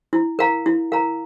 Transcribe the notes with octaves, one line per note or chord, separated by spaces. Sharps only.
E4
A#4 F5 A#5
E4
A#4 F5 A#5